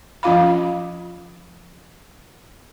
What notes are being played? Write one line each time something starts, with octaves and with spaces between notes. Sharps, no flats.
F3 C#4 F4 F5 B5